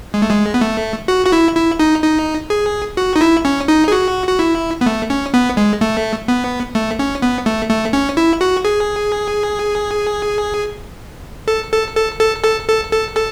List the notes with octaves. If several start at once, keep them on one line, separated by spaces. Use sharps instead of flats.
G#3
A3
G#3
B3
A3
F#4
F#4
E4
E4
D#4
D#4
G#4
F#4
D#4
E4
C#4
D#4
G#4
F#4
F#4
E4
B3
A3
C#4
B3
G#3
A3
B3
A3
C#4
B3
A3
A3
C#4
E4
F#4
G#4
A4
A4
A4
A4
A4
A4
A4
A4